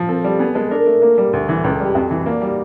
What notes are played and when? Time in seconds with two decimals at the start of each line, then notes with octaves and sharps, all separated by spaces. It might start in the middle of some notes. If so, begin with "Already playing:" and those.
Already playing: F3
0.09 C4 A4
0.24 G3
0.39 B3 G#4
0.55 G#3 A4
0.71 D4 A#4
0.87 A3
1.02 A#3
1.18 G3
1.33 D2
1.49 E3
1.64 C#2 A4
1.74 G#4
1.80 G3 G4
1.95 F2 F#4
2.11 E3
2.26 A#3 D4
2.36 D4
2.42 G3
2.47 D#4